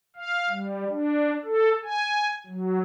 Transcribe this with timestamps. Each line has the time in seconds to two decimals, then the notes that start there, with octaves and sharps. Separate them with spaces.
0.16 F5
0.50 G3
0.89 D4
1.44 A4
1.84 G#5
2.46 F#3